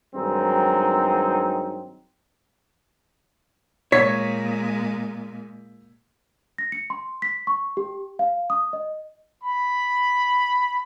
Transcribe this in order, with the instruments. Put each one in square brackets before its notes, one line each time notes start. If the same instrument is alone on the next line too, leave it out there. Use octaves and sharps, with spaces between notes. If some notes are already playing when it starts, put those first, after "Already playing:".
[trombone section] G2 D#3 F#3 G#3 C4 D#4
[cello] A#2 G#3 [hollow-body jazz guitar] C#5 [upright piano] G#6 B6
[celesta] A#6
C#7
C6
B6
C#6
G4
F5
D#6
D#5
[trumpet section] B5